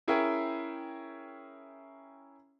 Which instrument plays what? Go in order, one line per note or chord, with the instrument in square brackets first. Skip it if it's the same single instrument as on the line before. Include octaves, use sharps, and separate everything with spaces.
[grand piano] C#4 E4 G#4 A#4 E5 G5